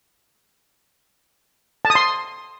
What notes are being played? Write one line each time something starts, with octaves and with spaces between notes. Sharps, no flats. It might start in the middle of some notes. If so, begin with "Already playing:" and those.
A5
D#6
C6